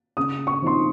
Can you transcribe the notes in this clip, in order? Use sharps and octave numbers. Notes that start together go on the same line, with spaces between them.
C#3 D#6
C#6
F3 C4 D#4 C6